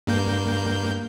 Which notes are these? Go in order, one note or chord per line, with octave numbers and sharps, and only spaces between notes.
G2 A#3 G6